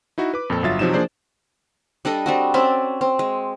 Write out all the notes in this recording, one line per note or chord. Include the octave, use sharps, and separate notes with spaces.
D#4 E4 F#4
B4 D6
F2 A#2 C4 A4
G1 F#3 F4 E5 A6
C3 F3 F#3 D#4 E7
F3 A#3 D4 G#4 C5 D5
G3 D4 A4 D#5
G3 C4 F#4
C4 C#4 D5 E5
C4
G#3